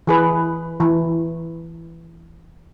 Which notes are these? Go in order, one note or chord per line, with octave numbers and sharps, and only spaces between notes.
E3 G#4 B4
E3